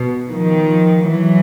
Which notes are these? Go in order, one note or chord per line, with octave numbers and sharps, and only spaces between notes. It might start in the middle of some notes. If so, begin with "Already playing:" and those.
Already playing: B2
D#3 F3
E3 F#3